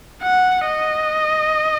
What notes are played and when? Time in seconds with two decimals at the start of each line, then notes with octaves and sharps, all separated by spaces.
0.23 F#5
0.66 D#5